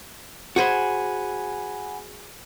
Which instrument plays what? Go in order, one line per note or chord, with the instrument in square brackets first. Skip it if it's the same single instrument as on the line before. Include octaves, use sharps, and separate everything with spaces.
[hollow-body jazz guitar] F#4 G#4 C5 [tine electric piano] F#5 G#5 B5